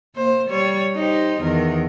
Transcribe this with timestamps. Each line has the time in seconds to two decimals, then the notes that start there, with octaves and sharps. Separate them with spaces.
0.15 A#3 C5
0.49 G3 C#5
0.95 D#4 G4 C5
1.40 E2 D#3 A#4